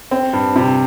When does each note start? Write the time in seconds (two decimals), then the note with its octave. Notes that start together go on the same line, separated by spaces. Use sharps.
0.11 C4
0.33 G2
0.56 C3